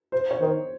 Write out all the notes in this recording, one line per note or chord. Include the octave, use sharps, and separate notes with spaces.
C5
C#5
D#3 C5